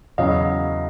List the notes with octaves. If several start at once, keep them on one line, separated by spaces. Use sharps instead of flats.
E2 C#3 F#3 D#5 F5